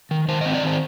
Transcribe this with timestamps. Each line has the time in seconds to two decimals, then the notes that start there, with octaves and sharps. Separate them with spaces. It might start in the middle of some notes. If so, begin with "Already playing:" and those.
0.11 D#3
0.28 D#3 C5
0.41 D#5
0.45 C4
0.54 D5
0.63 D#3 C5